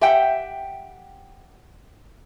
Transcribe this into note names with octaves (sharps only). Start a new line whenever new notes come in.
G4 E5 F#5 G5